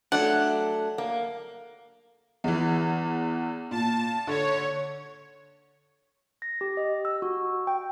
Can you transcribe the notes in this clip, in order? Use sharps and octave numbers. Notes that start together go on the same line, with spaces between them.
F#3 A3 D4 F#5
A#3
E2 E3
A#2 A5
D3 C#5
A#6
G4
D#5
E6
F#4
G5